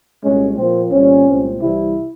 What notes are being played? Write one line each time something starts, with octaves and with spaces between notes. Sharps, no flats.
C2 A#2 G#3 C#4
A#2 F3 A#3 C4
C2 A#2 G3 C4 C#4
C2 A#2 G#3 C4
C2 C3 E3 G3 C4 E4